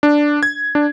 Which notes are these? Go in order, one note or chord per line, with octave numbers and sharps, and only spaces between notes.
D4
G#6
D4